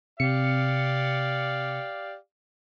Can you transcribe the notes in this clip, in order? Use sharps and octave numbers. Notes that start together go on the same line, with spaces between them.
C3 G4 D5 F5 C#7